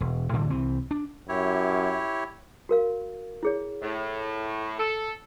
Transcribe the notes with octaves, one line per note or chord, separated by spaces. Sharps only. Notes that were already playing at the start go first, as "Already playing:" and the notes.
E1
A2 D3 E3 G3
C2 E3 C4
D4
F#2 E4 G4 C#5
F#4 A#4 F5
E4 G#4 C#5
A2
A4